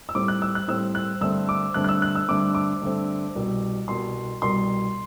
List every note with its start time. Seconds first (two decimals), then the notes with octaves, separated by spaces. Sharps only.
0.09 E6
0.15 A2 G3 C4 D6
0.28 F#6
0.42 E6
0.55 F#6
0.68 A2 G3 C4 E6
0.95 F#6
1.21 G2 D3 A3 C4 E6
1.49 D6
1.74 G2 D3 A3 C4 F#6
1.84 F#6
1.89 E6
2.02 F#6
2.15 E6
2.28 G2 D3 A3 C4 D6
2.55 D6
2.82 G2 D3 A3 C4
3.35 C2 B2 G3
3.88 C2 B2 G3 C6
4.42 C2 B2 G3 C6